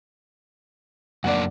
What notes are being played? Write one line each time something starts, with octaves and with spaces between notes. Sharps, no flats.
F#2 A#3 D4 D5 F#5